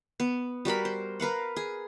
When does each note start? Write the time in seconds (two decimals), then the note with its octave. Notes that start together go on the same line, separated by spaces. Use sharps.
0.20 B3
0.65 G3 F#4 A#4 B5
0.85 C5
1.20 A#4 B4 F5 F#5
1.56 G#4